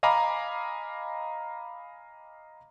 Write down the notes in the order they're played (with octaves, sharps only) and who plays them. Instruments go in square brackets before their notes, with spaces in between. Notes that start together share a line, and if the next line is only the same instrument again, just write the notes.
[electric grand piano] D#5 F5 G#5 A#5 B5 D6